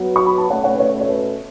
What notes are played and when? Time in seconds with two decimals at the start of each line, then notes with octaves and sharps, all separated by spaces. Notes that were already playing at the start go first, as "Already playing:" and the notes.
Already playing: F#3 B3 F#4
0.16 C#6
0.27 B5
0.38 A5
0.50 B2 A3 C#4 C#5 F#5
0.64 C#5 F#5
0.74 B4
0.80 C#5
0.93 B4
1.01 C#5
1.09 B4